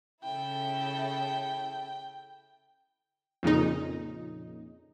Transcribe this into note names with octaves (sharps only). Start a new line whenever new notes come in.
C#3 E4 A4 G5
F2 A#2 C#3 D#4